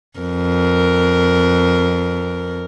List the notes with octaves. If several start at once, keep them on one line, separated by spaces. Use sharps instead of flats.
F2 A#4